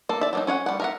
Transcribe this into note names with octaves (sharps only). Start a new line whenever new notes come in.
A#3 A4
D5 E5
F#3 A#3 D#4
C#4 C#5 F5 F#5
G3 F#5
A#4 E5 F#5